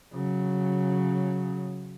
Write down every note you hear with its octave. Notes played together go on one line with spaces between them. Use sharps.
C#3 F#3